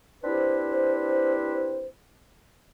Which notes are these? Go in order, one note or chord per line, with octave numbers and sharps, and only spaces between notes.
C4 D4 E4 G4 B4 C5